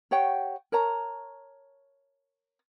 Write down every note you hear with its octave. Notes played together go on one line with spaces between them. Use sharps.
G4 C#5 F#5 G5
A#4 C#5 A5 A#5